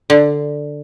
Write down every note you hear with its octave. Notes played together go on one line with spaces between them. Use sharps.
D3